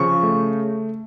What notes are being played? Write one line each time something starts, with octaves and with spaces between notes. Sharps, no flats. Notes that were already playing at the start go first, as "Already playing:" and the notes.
Already playing: C#3 F3 C#6
A3